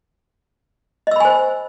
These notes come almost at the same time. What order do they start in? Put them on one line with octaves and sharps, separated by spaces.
D#5 E6 B5 G#5 C5